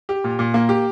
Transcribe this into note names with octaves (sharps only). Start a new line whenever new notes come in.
G4
A#2
A#2
A#3
G4